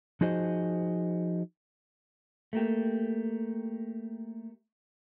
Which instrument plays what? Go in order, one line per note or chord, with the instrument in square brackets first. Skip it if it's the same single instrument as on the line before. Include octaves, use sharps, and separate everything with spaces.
[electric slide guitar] F3 D#4 F#4 G#4 C5 D#5
A3 A#3 G4